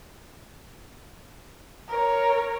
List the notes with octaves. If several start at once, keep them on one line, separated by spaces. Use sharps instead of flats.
A#4 C#5